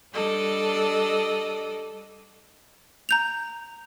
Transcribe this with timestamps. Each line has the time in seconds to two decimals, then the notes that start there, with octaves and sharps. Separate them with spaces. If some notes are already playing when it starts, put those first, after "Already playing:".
0.12 G3 D4 A4 D5 D#5
3.09 A#5 G6 F7